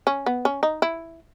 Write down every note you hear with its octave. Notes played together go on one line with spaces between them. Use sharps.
C#4
B3
C#4
D#4
E4